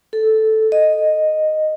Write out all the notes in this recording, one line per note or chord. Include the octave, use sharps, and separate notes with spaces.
A4
D#5